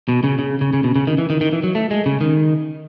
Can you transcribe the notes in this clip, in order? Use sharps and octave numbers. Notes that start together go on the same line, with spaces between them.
B2
C#3
C#3
C#3
C#3
B2
C#3
D#3
E3
D#3
D#3
E3
F#3
A3
G#3
C#3
D#3